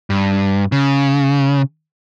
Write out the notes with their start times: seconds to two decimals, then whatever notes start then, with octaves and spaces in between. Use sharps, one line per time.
0.10 G2
0.72 C#3